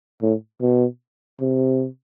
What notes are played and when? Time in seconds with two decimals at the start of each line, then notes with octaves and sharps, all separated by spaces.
0.22 A2
0.61 B2
1.40 C3